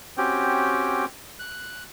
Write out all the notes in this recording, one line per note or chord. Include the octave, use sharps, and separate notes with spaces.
C4 C#4 F#4 G4 G5
F#6